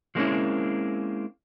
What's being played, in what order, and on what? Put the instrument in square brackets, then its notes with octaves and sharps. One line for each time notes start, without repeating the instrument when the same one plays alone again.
[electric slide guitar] F3 G#3 A#3 C4 C#4 E4